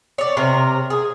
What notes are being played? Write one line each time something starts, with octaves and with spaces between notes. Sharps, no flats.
C#5 D5
C3 A#4
G#4